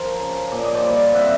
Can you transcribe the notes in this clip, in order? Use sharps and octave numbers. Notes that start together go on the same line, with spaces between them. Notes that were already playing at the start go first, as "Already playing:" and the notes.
Already playing: F3 A#4 C5
C#3
A#2 D5
D#5
C5 D5
G3
C4 E5 F#5